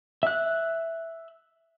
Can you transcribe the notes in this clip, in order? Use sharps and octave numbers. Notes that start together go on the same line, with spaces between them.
E5 F#6